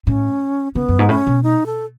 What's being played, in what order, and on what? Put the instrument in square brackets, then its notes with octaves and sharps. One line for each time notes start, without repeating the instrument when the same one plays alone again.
[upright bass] A2 [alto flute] C#4
[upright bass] C#3 [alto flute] B3
[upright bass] F#2
G#2
[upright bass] A2 [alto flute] C#4
[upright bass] B2
[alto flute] D#4
A4